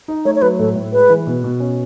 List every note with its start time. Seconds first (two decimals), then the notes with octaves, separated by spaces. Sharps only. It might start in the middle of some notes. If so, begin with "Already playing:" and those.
0.08 D#4
0.25 A3 C#5
0.36 C#5
0.42 F#3 B4
0.59 A2 A4
0.75 A2
0.92 G#3 B4
1.10 E3
1.27 B2
1.44 B2
1.60 C#4